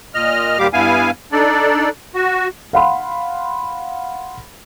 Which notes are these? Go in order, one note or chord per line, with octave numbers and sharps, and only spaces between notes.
A#2 D#5 F6
D#2 A#2 G3 G4 F5 D6
G2 B3 E4 F5 G#5
D4 D#4 A4 D5
F#4
F5 F#5 B5 C6